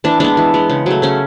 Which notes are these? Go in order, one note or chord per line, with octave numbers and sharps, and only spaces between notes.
E3 D4
G#3 B3 D4
E3
G#3 B3
C#3
F#3 A3
C#3 C#4